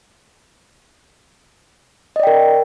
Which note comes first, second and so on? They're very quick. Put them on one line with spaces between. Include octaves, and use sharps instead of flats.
D#5 D5 G5 A#4